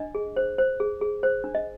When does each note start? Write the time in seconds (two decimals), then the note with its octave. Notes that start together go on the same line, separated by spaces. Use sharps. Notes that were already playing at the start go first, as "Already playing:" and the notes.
Already playing: D4 D#5
0.15 G#4
0.36 C5
0.58 C5
0.80 G#4
1.01 G#4
1.23 C5
1.44 D4
1.55 D#5